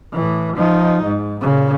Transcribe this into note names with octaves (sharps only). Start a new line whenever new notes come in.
A2 E3
F3 D#4
G#2
A#2 C#3